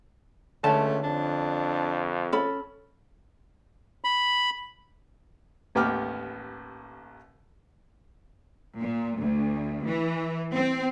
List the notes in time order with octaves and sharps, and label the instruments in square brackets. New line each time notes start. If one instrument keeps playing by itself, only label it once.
[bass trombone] C#2 [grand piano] D3 C#4 [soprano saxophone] A3 [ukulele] A5
[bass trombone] F2 [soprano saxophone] D4
[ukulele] C#4 A4 B5
[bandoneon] B5
[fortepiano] A1 D#2 B3 G5 D6 F6
[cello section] A#2
D2
E3
C4